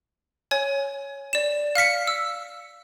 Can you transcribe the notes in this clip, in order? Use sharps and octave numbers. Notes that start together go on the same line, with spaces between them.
C#5 G#5
D5 E7
F5 F6 B6 C#7
E6